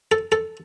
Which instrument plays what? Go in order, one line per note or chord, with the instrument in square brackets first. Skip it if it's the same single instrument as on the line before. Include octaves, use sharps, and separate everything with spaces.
[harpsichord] A4
A4